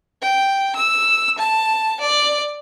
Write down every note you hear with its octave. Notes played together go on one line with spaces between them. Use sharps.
G5
E6
A5
D5